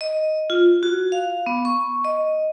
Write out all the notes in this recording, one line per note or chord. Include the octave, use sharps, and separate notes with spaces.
D#5
F4
F#4
F5
B3
C#6
D#5